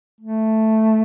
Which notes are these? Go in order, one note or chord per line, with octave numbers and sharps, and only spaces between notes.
A3